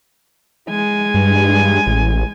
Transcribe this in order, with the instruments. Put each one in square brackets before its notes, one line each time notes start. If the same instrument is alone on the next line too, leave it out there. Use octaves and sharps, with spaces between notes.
[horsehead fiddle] G#3 G#5
[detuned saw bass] G2
A1